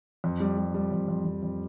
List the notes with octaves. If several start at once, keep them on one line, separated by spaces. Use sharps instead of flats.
F2
G3
G3
G3
F2
F2
F2
F2